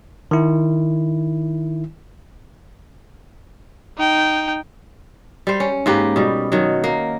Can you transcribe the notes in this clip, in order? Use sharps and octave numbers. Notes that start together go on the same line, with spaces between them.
D#3 E4
D#4 G5
G3 C5
C#4
G#2 A#3 G4 B4
B2 G3
D#3 F#3
A#3